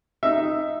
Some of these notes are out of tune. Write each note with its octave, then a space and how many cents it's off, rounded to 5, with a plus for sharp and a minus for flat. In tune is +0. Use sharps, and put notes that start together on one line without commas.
D#4 +0 E5 +10